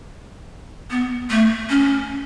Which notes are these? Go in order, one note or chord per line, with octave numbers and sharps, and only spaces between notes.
B3
A3
C#4